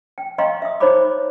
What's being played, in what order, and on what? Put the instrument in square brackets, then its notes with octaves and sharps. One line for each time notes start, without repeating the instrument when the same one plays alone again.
[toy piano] G5
D#5 F5 G5 A#5 C6 C#6
E5 D#6
D#4 C5 C#5 A#5 B5 D6